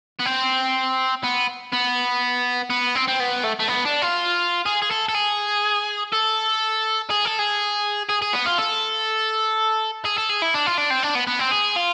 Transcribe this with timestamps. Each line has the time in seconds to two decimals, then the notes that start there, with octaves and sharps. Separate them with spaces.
0.20 B3
0.26 C4
1.23 B3
1.73 B3
2.70 B3
2.95 C4
3.08 C4
3.20 B3
3.44 A3
3.59 A3
3.68 B3
3.85 D4
4.02 F4
4.66 G#4
4.82 G#4
4.91 A4
5.09 A4
5.15 G#4
6.13 A4
7.11 G#4
7.25 A4
7.39 G#4
8.09 G#4
8.22 G#4
8.33 B3
8.46 F4
8.58 A4
10.05 G#4
10.18 A4
10.29 G#4
10.42 E4
10.54 D4
10.66 F4
10.78 D4
10.91 C4
11.03 D4
11.15 B3
11.27 B3
11.40 C4
11.52 G#4
11.76 F4